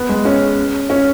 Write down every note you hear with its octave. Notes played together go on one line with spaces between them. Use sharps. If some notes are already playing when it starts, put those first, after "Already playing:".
Already playing: B3
G#3
C#4
C#4